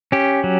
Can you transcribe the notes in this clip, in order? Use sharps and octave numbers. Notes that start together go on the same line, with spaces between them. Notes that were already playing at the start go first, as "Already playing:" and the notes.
C#4 G4
F#3